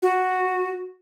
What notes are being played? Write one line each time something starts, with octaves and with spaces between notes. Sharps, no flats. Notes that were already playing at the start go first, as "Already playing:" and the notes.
F#4